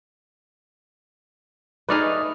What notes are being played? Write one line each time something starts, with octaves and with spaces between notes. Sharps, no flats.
A3 D#4 G#4 B4 D5 F6